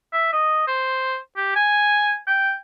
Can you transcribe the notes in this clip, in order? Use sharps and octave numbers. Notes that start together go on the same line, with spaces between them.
E5
D#5
C5
G4
G#5
G5